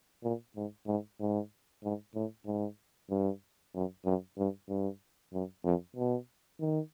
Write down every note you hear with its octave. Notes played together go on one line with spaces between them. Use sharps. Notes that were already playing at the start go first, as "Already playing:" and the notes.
A#2
G#2
G#2
G#2
G#2
A2
G#2
G2
F#2
F#2
G2
G2
F#2
F2
B2
D#3